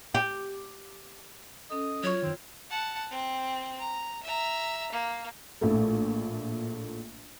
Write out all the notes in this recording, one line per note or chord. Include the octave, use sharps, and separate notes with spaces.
G4
C#4 A4 D#5
F#3 F4 C#5 C#6
F#2 D#3 C4
F#5 A5
C4
A#5
E5 A#5
A#3
A#1 A2 A3